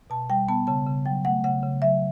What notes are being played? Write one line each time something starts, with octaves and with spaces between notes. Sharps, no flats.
B2 A5
G3 G5
B3 A5
C#3 A5
C#3
F#3 G5
A3 F#5
C#3 F#5
C#3
F#3 E5